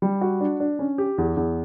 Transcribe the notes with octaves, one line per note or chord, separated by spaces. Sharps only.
G3
F#4
D4
D4
C#4
G4
E2
E2